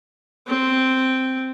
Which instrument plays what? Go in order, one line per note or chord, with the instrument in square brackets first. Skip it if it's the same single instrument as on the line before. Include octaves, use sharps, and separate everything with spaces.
[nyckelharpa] C4